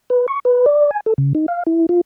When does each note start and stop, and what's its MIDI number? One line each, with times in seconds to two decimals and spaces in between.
0.10 0.26 71
0.28 0.39 85
0.45 0.66 71
0.66 0.91 74
0.91 1.00 80
1.06 1.14 69
1.18 1.33 49
1.35 1.46 63
1.48 1.63 77
1.67 1.86 64
1.89 2.01 65